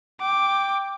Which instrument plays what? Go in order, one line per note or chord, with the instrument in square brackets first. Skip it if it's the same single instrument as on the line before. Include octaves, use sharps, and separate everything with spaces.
[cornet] G5 [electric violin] D6